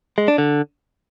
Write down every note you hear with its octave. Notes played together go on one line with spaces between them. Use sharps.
G#3
D4
D3